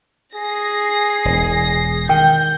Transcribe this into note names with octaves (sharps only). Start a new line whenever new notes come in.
G#4 A#6 C7
E1
D#3 G5 G6